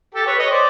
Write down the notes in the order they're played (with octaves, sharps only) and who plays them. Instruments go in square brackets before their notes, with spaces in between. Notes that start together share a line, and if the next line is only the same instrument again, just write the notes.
[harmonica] G4 A4
B4 C#5
C#5 D#5
C5 D5